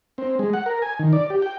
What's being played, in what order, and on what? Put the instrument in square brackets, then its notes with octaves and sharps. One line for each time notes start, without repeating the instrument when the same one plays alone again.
[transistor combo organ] C4
G#3
F#5
A#4
G#5
D#3
D5
G4
G5